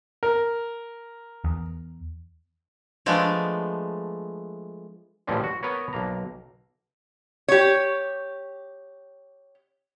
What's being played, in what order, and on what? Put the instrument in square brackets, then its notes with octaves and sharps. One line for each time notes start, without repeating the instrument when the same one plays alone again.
[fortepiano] A#4
[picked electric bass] E2
[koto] F3 G#3 A3 B3 D4
[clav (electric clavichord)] A1 A#2 E3 F3 G3 G#3
F#4
B3 A#4 B4 C#5
B1 A#3 A#5
[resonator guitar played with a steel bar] G4 C#5